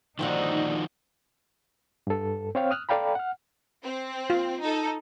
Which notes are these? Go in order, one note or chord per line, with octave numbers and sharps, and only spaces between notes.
D3 D#3 F3 A#3 C4 D#4 F#4
G2 A4
C4 C#5 F5 G5 F6
D#6 F6 F#6
A4 D5 F5 G5 A#5 B5
F#5 F6
C4
F4
D#4 A4